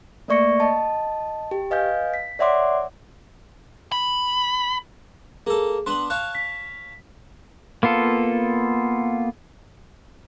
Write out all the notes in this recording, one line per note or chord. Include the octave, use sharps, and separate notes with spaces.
A3 A#3 D5 C#6 A#6 C#7
D#5 A5
G4
B4 D#5 F5 G#5 G6
B6
C#5 D5 E5 F#5 C6 D6
B5
A#3 G#4 A4
B3 D4 B4 C6 F#7
C#5 F5 A5 F#6
B6
A#3 B3 F4 A4